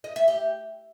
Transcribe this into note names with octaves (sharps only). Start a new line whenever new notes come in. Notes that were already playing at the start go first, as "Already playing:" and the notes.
D#5
E5
G4